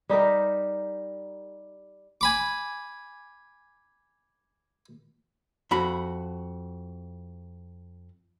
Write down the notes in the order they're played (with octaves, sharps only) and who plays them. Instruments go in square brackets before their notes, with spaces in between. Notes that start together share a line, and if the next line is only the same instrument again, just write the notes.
[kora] G3 D#4 G4 A#4
[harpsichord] G#5 B5 D6
[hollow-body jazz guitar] F2 F#4 B5